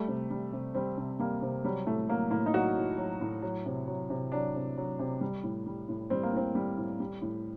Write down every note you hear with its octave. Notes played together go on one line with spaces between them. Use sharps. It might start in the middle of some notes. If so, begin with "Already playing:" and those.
Already playing: G3 A3
C3
G3
C3
G3 C4
C3
G3 A#3
C3
F#3 G3
A2 A3
F#3 A#3
A2 A#3
D#4
F#3 F#4
A2
F#3
A2
F#3
C3
F#3
C3
F#3 D4
C3
F#3
C3
G3
A2
G3
A2
G3 C4
A#3
A2 C4
G3
A2
G3
A2